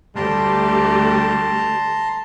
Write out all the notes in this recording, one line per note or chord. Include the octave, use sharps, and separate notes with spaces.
D2 G3 A3 G4 A5 A#5 C6